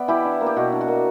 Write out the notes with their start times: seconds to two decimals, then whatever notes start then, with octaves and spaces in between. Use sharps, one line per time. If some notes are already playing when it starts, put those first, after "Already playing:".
Already playing: B3 D5 E5
0.08 E3 E4 G4
0.25 D4
0.41 A#3
0.46 G4
0.56 B2 F#4
0.72 D4
0.81 F#4
0.88 A#3